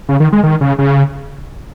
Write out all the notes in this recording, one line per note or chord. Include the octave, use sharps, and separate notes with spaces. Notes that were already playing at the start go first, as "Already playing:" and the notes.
C#3
D#3
G#3
D#3
C#3
C#3